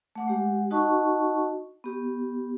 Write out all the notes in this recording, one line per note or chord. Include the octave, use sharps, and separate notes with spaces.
A3 F#5 D6
G#3 G4 F#5
D#4 F#4 D#5 F#5 A5 C#6
B3 G4